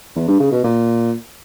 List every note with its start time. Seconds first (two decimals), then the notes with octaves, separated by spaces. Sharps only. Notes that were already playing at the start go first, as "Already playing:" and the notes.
0.16 E2
0.28 G2
0.40 C#3
0.52 B2
0.64 A#2